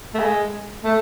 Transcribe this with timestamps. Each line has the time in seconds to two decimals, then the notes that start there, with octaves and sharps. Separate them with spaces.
0.14 A3
0.19 G#3
0.84 A3